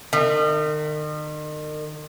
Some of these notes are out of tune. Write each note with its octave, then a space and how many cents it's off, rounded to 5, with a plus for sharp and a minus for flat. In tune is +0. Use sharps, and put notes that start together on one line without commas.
D#3 -40